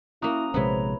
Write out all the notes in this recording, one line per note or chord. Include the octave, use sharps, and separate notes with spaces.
A#3 C#4 E4 F#4 A#5 D#6
A#1 C3 G#3 B3 E4 C5 C#5 A#5